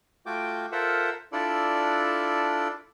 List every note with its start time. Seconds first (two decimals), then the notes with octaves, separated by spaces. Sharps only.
0.26 A3 F4 F#4 G5 D6
0.72 F4 A4 A#4 C5 E5 F#5
1.32 D4 E4 F4 A4 D5